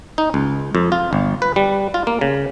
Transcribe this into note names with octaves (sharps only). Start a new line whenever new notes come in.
D#4
C#2
F2
F4
G1
B4
G3
F4
A#3
C#3